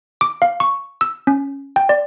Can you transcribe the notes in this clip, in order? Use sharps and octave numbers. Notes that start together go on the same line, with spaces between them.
D6
F5
C#6
E6
C#4
G5
D5